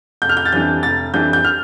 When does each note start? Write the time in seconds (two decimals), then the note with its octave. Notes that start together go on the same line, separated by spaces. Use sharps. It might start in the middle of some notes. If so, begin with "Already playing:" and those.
0.22 F1 G6
0.29 F6
0.37 G6
0.45 A6
0.52 F2 E3 G3 D4 G6
0.83 F1 A6
1.13 F2 E3 G3 D4 G6
1.33 G6
1.44 F6